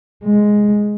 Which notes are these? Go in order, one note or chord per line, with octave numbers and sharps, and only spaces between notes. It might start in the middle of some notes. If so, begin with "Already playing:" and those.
G#3